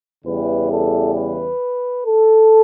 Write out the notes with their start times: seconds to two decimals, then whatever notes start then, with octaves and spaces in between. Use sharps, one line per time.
0.25 E2 C#3 E3 G3 B4
0.71 A4
1.15 B4
2.06 A4